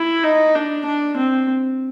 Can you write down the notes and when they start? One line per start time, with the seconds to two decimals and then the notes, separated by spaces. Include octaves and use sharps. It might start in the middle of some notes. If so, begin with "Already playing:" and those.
Already playing: E4
0.24 D#4
0.55 D4
0.86 D4
1.17 C4